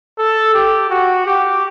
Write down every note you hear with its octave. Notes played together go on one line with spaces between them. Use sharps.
A4
G4
F#4
G4